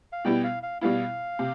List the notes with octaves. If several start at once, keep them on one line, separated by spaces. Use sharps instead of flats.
F5
B2 G3 B3 E4 G5
F5
F5
B2 G3 B3 E4 F5
C3